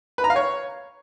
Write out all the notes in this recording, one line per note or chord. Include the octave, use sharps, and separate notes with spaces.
B4
A#5
F5
C#5